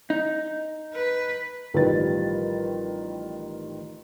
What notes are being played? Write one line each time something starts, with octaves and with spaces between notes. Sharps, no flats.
D#4
B4
A1 D#3 F3 G3 B4 A6